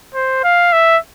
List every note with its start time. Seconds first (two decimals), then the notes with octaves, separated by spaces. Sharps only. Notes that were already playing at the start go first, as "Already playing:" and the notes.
0.14 C5
0.44 F5
0.73 E5